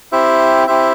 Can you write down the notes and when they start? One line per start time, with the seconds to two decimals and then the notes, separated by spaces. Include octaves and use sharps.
0.12 C4 E4 G4 C5 E5
0.67 C4 E4 G4 C5 E5